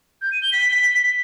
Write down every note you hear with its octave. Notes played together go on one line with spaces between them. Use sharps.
G6
D#7
G7
B6